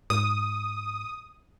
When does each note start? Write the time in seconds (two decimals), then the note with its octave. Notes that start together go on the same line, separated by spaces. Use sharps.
0.10 G#2 D#6